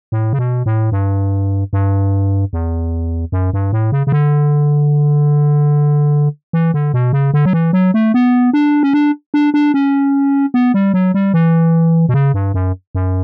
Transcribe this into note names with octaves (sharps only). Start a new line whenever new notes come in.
A2
C#3
B2
A2
G2
G2
E2
F#2
G2
A2
C#3
C#3
D3
E3
D3
B2
C#3
D3
F#3
E3
F#3
A3
B3
D4
C#4
D4
D4
D4
C#4
B3
G3
F#3
G3
E3
B2
C#3
G2
F#2
F#2